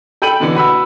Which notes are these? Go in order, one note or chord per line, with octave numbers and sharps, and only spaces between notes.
A4 G5 B5 D#7 F#7
B2 D3 E3
F#4 B4 B5 E6